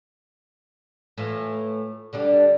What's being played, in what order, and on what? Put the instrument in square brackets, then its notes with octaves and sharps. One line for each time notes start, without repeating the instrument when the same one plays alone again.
[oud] A2 E3 F4
D3 G3 D4